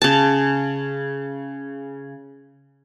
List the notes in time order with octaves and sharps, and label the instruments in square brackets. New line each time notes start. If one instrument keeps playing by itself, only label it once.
[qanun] C#3 A5